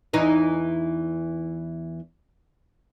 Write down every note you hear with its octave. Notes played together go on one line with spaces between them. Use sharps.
E2 E3 D#4